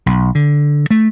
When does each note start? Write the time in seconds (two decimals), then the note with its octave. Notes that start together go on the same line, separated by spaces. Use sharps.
0.06 B1
0.35 D3
0.91 A3